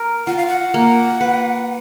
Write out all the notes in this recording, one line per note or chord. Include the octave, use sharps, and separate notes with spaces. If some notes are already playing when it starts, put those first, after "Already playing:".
Already playing: A#4
F4 F#5
F5
F#5
A#3
B4